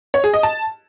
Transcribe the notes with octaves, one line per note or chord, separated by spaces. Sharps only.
C#5
G#4
D#5
A5